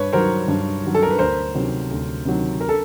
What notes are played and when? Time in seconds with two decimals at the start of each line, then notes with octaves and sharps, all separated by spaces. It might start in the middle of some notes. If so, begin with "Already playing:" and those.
Already playing: G2 B4 C#5
0.13 D#3 F#3 A#4 C5
0.48 G2
0.83 D#3 F#3
0.95 A4
1.03 A#4
1.10 B4
1.19 D2 A#4 C5
1.54 C3 D#3 F#3
1.91 D2
2.25 C3 D#3 F#3
2.61 A#4
2.69 A4